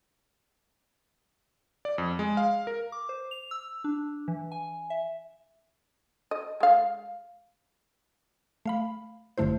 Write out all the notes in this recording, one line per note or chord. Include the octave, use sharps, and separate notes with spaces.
D5
F2
G#3
F5
A#4
D6
C5
F7
E6
D4
E3
G#5
E5
D#5
G#3 F5
A3 F5 B5
G#1 G2 D3 A3 E4 C5